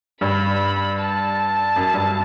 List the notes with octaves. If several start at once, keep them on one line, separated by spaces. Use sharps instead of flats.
G2 B5
A5
F#2
G2